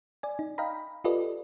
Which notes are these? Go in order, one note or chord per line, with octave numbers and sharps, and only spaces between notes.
D5 G#5
D#4
D#5 F5 G5 A#5 B5
F4 G4 A4 B4 D5 D#5